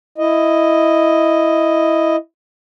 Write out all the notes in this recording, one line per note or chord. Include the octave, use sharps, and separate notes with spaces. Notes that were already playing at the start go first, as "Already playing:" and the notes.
E4 D#5